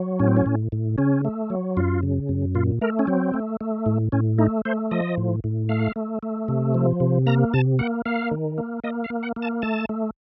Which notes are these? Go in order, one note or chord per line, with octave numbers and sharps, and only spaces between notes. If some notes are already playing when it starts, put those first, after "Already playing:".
Already playing: F#3
A2 C#4
C4
C#4
A2
A2
C#3 C#4
A3
F#3
F#2 F4
C#3
F#2
A#2 F4
A3 A#4
C#4
F#3 C4
A3
A3
A2
A2 C#4
A3 D#4
A3 C5
F3 D#5
A2
A2
A3 F5
A3
A3
C3
F3
C3
A#3 A#5
C3 A5
A#3 F#5
A#3 F5
D#3
A#3
A#3 D#5
F5
A#3
F#5
A#3
A5
A3 A5
A3